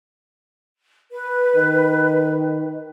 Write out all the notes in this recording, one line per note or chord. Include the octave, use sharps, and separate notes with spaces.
B4
D#3